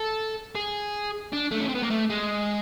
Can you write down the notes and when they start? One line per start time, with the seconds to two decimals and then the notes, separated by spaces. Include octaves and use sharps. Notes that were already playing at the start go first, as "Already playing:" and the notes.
Already playing: A4
0.55 G#4
1.32 D4
1.51 A3
1.60 C#4
1.68 C4
1.75 B3
1.82 A#3
1.90 A3
2.10 G#3